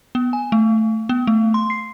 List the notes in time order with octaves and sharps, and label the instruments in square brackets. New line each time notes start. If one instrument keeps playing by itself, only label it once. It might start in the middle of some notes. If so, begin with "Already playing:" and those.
[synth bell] B3
G#5
A3
B3
A3
C6
C7